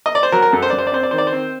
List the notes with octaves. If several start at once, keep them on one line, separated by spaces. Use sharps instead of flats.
D#5
D5
C5
F#3 A#4
A#4
F#2 A4
C5
F#2 D5
C5
D5
C4 C5
D5
D#3 C5
D5
C5
C4